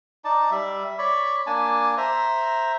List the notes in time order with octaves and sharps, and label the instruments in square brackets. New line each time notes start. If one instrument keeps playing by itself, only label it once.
[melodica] D#4 D5 A5
G3 E5
C#5 D5 B5
A#3 D4 G#5 A5
C5 E5 A#5